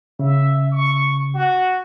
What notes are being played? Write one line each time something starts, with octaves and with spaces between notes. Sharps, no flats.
C#3 E5
C#6
F#4